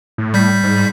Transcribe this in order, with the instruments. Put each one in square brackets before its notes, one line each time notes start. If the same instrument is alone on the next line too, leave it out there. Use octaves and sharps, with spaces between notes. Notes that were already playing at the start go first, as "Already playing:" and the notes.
[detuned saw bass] A2
[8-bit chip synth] G3 G6 B6
[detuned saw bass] G#2